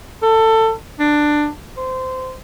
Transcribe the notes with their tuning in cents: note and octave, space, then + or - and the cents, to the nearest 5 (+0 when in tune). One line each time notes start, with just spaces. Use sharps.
A4 +20
D4 +15
C5 -20